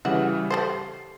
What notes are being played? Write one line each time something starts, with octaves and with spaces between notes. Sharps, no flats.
C#3 E3 F#3 G3 E5 F#5
G3 A4 C5 C7